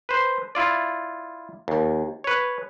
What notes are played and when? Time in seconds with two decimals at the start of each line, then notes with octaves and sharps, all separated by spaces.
0.09 B4 C5
0.55 E4 F4 D5
1.68 D#2
2.24 B4 C#5